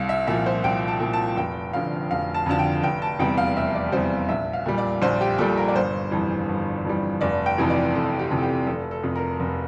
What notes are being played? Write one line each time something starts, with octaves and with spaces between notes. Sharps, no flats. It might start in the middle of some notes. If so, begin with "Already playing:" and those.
Already playing: C2 F5
E5
A#2 F3 E5
C5
C2 G5
A5
A#2 F3
A5
F1 G5
F2 D3 F3 F5
F1 F5
A5
F2 D3 F3 A5
G5
F1 G5
A5
E2 C3 G3 G5
F5
F1 E5
D5
E2 C3 G3 C5
A#1 E5
F5
A#2 G3
D5
A#1 C5
G4
A#2 G3 A4
A#4
D5
G1 C5
F2 E3 G3
G1
F2 E3 G3
F1 D5
G5
F2 C3 E3
D5
F1 A4
G4
F2 C3 E3
A4
G4
F1 A4
A4
F2 C3
A#4
F1